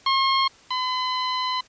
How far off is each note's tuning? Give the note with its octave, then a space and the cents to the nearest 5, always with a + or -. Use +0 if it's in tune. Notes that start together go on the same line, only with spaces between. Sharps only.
C6 +45
B5 +45